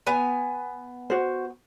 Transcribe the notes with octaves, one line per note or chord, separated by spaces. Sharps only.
B3 G#5
F#4 C5